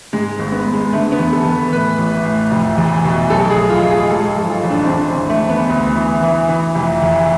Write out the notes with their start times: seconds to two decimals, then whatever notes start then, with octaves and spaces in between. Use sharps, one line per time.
0.13 G#2 G#3
0.39 G#1
0.52 B3
0.65 G#1
0.73 G#3
0.93 D3 A3
1.12 B3
1.19 E2
1.33 A4
1.45 E2
1.52 B4
1.72 A2 B4
1.98 A1
2.25 A2
2.51 F1
2.77 E2
3.05 B2
3.30 B1 A4
3.50 G#4
3.57 B1
3.70 F4
3.84 B1
3.90 G#4
4.10 G#2 A4
4.30 A4
4.37 F3
4.50 F4
4.63 A1
4.70 D4
4.84 C4
4.89 E2 D4
5.10 C4
5.16 E2
5.29 A3
5.43 E2
5.50 B3
5.70 D2
5.96 E3
6.22 E3
6.48 E3
6.75 F1
7.02 E2